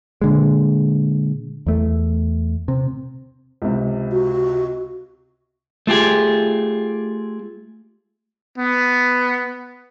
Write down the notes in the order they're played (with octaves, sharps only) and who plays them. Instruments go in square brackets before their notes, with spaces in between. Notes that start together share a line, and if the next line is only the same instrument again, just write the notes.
[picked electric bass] A#2 D3 G#3
E2 A3
C3
[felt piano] C#2 C3
[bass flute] F#4
[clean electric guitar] A3 F4 G4 G#4
[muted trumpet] B3